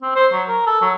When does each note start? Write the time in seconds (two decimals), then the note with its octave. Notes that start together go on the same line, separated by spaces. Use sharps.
0.02 C4
0.16 C5
0.32 F#3
0.48 A#4
0.67 A4
0.82 F#3